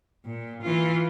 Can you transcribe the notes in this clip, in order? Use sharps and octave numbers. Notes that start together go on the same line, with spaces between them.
A#2
E3 F4